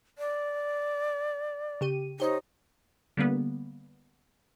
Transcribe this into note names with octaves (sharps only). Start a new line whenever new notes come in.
D5
C#3 G4 D#7
D#4 G4 C5 C#5
D3 G3 A#3 B3